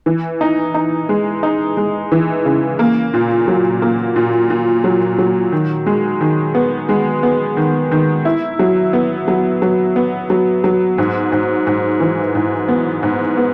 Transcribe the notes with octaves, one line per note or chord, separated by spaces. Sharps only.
E3
D#4
D#4
G#3
D#4
G#3
E3
C#3
A#3
A#2
F#3
A#3
A#2
A#2
F#3
F#3
D#3
G#3
D#3
B3
G#3
B3
D#3
D#3
E4
F#3
B3
F#3
F#3
B3
F#3
F#3
G#2
G#2
G#2
E3
G#2
B3
G#2
B3